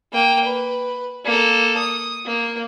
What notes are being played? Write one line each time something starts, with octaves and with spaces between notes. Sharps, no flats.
A#3 G5
B4
A#3 A4
D#6
A#3